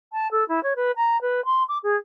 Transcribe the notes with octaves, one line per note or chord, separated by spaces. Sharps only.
A5
A4
E4
C#5
B4
A#5
B4
C6
D6
G#4